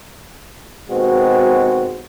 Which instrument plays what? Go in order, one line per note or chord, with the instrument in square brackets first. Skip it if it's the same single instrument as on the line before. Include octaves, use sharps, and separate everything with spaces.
[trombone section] D#2 B2 G#3 C4 F#4